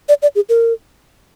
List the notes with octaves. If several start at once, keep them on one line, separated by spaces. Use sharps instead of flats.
D5
D5
G#4
A#4